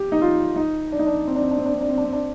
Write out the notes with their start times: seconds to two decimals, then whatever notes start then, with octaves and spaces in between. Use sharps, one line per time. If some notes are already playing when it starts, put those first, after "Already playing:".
Already playing: G4
0.12 D#4
0.22 F4
0.56 D#4
0.92 D4
0.99 D#4
1.07 D4
1.27 C4
1.36 D4
1.43 C4
1.51 D4
1.58 C4
1.66 D4
1.74 C4
1.81 D4
1.89 C4
1.98 D4
2.05 C4
2.13 D4